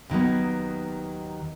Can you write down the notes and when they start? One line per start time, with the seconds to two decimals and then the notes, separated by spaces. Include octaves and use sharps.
0.09 D#2 D#3 F#3 B3